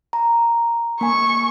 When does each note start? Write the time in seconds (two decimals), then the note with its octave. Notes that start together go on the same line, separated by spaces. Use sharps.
0.13 A#5
1.01 A#3 G#5 C#6